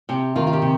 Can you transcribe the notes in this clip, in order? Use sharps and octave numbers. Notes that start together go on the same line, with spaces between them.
C3 G4
D#3 F4
F4
G4
C3